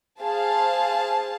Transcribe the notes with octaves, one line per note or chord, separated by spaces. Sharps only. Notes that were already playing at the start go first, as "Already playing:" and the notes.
G#4 C5 F5 A5